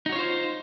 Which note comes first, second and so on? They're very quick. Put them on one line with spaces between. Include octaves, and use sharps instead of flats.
D#4 F#4 C#5 F4 C5